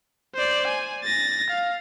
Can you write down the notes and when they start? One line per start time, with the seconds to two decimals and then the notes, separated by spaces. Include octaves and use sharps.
0.35 C5 D5
0.67 G#5
1.04 A6 A#6
1.50 F5